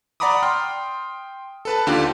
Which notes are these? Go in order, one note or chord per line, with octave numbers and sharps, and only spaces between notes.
D5 F#5 A#5 B5 D6 D#6
G5 C6 F6
A4 B4 A5
D#2 D3 D4 F4 G4